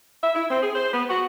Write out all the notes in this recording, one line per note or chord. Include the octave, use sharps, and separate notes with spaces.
E5
E4
C4
G#4
C5
B3
F#4